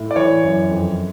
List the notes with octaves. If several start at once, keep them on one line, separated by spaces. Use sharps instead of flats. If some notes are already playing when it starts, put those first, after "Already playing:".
Already playing: A2
D5
E3 C#5
F#2
F2